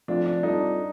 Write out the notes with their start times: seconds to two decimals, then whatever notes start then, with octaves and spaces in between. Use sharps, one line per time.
0.08 F3 A3 C4 D4 F4
0.26 D4
0.43 G3 C4 D#4 F4 A4
0.61 D4